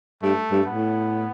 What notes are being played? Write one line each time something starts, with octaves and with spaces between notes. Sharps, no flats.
G2 A3
G2
A2 B3